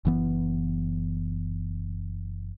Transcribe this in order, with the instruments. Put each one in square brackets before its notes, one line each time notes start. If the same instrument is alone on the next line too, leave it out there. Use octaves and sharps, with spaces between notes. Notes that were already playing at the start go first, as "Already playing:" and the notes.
[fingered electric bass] F#1 E3 B3